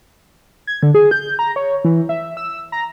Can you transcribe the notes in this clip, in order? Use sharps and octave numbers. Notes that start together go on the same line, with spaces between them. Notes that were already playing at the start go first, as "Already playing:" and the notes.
G#6
D3
G#4
G6
A#5
C#5
E3
E5
E6
A#5